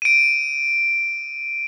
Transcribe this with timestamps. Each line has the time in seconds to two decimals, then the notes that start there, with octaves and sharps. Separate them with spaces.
0.02 D7 D#7